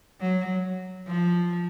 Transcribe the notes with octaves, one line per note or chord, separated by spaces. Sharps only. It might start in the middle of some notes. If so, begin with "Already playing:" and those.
F#3
F3